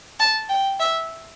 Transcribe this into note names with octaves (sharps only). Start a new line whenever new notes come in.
A5
G5
E5